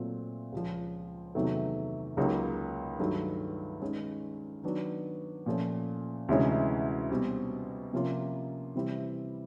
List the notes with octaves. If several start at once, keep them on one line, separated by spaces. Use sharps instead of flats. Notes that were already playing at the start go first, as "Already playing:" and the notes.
Already playing: A#2 F#3 A3 C4 F4
C#2 C#3 F3
E2 C3 D#3 F#3 A3
C#2 C#3 F#3 A#3 D#4
G2 D#3 F#3 A3
D#3 G#3 C#4
D#3 F#3 B3 D4
A#2 F3 A3 C#4
D2 C3 E3 G#3 C#4
B2 G3 C4
C3 F3 A#3 C#4 F4
C3 E3 G3 C4 E4